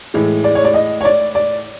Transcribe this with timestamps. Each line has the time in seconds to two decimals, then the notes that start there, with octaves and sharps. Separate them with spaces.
0.14 A2 E3 G#3
0.44 D5
0.55 C#5
0.65 D5
0.74 D#5
1.01 C#5
1.05 D5
1.35 D5